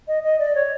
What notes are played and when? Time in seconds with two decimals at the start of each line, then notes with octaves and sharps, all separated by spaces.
0.08 D#5
0.23 D#5
0.39 D5
0.55 C#5